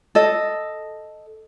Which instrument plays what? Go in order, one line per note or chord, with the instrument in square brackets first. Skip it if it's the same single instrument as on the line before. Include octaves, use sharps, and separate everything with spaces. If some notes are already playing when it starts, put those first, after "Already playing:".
[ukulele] A4 D#5